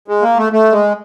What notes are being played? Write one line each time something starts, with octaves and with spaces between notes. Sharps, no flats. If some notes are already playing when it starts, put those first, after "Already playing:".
G#3
A#3
A3
A3
G#3